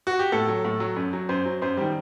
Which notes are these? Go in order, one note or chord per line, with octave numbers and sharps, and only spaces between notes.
F#4
G4
A2 A4
F#3
A2
F#3
F#2
F#3
F#2 C5
F#3
F#2 C5
D#3 G3